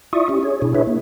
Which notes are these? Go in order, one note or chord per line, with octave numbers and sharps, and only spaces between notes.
E4 F4 D5 E5 C#6 D#6
C#4 G4
G#4 C#5
B2 D4 E4 G#4
D4 E4 G#4 B4 C#5 E5
A#3